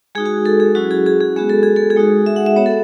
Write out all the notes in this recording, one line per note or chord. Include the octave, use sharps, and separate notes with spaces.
G#3 D#4 F#4 G#4
F#4
A4
G#4
F#3 C#4 E4 F#4
G#4
G#4
G#4
G#3 B3 F#4 G#4
A4
G#4
A4
G#4
G#3 D#4 F#4
E5
F#5
E5
B3 F#4 C#5
A4